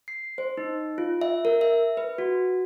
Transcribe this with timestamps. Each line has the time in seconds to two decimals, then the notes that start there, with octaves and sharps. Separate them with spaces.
0.08 C7
0.38 C5
0.57 D#4
0.98 F4
1.22 E5
1.45 A#4
1.61 E5
1.97 B4
2.18 F#4